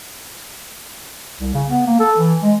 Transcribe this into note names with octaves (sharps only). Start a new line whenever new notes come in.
C2
C#3
B3
A#3
A4
E3
G#3